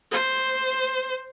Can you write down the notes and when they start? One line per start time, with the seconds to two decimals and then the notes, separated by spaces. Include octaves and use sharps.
0.11 C5